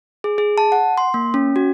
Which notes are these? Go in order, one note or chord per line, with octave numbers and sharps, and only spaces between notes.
G#4
G#4
A5
F#5
C6
A#3
C#4
F#4